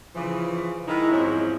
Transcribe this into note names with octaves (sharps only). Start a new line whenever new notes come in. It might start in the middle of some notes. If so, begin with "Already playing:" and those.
C#3 E3 F3
D#3 G#3 D#4 E4
E2 G#2 F3 F#3 C4 E4